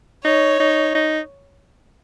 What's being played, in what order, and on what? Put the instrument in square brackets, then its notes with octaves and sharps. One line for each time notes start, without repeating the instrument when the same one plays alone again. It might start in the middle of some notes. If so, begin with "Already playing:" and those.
[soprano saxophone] D#4 [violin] C#5
[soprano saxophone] D#4
D#4